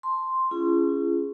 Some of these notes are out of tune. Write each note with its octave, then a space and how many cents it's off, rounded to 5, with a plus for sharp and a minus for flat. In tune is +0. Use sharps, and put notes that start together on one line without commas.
A5 +0 C6 +0
C#4 +0 F4 -45 G#4 +0